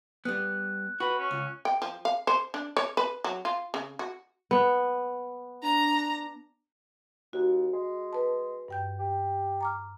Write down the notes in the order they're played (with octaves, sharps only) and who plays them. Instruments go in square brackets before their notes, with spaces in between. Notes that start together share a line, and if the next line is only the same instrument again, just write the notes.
[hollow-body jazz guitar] G3 B3 [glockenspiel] F#6
[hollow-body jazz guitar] F#4 [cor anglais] B4
[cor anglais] C#4
[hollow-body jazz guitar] C#2
[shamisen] G5
F3
F5
C5
D4
C#5
B4
F#3
F4
C#3
F#4
[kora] B3
[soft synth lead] D4 [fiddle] A#5
[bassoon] D#2 [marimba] F#4
[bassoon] G#3
[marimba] B4 A5
G2 G5 G6
[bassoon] G4
[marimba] A#5 D6 F6